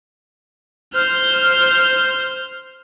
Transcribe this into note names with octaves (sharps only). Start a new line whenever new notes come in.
C5 F6